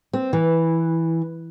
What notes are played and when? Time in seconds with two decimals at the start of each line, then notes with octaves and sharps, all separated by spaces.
0.13 C4
0.33 E3